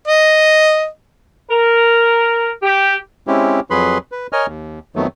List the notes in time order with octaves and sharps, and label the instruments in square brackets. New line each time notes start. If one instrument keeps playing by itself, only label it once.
[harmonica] D#5
[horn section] A#4
G4
[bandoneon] G#3 C4 C#4 E4 G4
F2 F#3 G#4 B4 B5 C6
B4
A#4 C#5 D#5 G#5 F6
D#2
F2 D#3 F#3 A3 B3